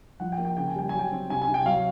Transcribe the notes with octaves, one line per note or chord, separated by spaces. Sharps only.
F3 F#5
G5
A#3
G5
C#3 G5
G#5
G3 G5
F#3 G#5
G5
C4
C3 G#5
G#5
C3
G5
F#3 F5